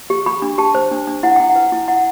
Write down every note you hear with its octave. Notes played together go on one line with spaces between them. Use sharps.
G4
G4 B5
D4
G4 A5
C5
D4
D4
E4 F#5
E4 G5
F#5
B4
E4
E4 F#5